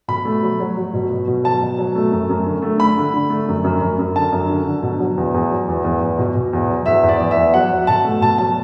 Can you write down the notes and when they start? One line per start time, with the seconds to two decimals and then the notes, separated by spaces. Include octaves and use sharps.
0.08 B2 B5
0.25 A3
0.43 F#3
0.60 F#3
0.77 F#3
0.94 B2
1.10 B2
1.28 B2
1.44 F#3 A5
1.62 B2
1.78 F#3
1.95 A3
2.12 F#2
2.30 F#2
2.46 D3
2.62 A3
2.79 A3 B5
2.97 D3
3.14 D3
3.30 A3
3.48 F#2
3.64 F#2
3.81 F#2
3.99 F#2
4.15 D3 A5
4.33 F#2
4.50 D3
4.67 D3
4.83 B2
5.00 F#3
5.18 E2
5.34 E2
5.51 F#3
5.68 E2
5.84 E2
6.01 E2
6.19 B2
6.35 B2
6.53 E2
6.69 F#3
6.86 E2 E5
7.03 E2
7.09 D5
7.20 E2
7.31 E5
7.36 E2
7.54 F#3 F#5
7.72 F#3
7.87 B2 A5
8.04 A3
8.21 B2 A5
8.38 F#3 A5